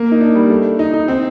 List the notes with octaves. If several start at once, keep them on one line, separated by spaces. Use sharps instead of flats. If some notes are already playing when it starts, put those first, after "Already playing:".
Already playing: A#3
D#4
D4
G3
A3
D#4
D#4
C4